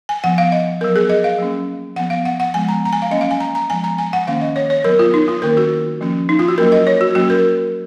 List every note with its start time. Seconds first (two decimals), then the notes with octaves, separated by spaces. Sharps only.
0.09 G#5
0.24 F3 B3 F#5
0.38 F5
0.52 D#5
0.81 F#3 B3 A#4
0.96 G#4
1.09 D#5
1.24 F5
1.39 F#3 A#3 C#4
1.96 F3 B3 F#5
2.10 F5
2.25 F#5
2.40 F#5
2.54 F3 G#3 B3 G#5
2.69 A#5
2.85 A#5
2.93 G#5
3.02 F5
3.11 F#3 A#3 C#4 D#5
3.21 F5
3.31 G#5
3.40 A#5
3.55 A#5
3.69 F3 G#3 B3 G#5
3.84 A#5
3.98 G#5
4.13 F#5
4.27 D#3 A#3 C#4 F5
4.41 D#5
4.56 C#5
4.70 C#5
4.84 F#3 B3 A#4
4.99 F4
5.14 D#4
5.28 F4
5.42 D#3 A#3 C#4 A#4
5.57 F#4
6.01 F3 A#3 C#4
6.29 D#4
6.39 F4
6.48 F#4
6.58 F#3 A#3 C#4 A#4
6.72 D#5
6.87 C#5
7.01 F#4
7.15 F#3 A#3 C#4 F#4
7.30 A#4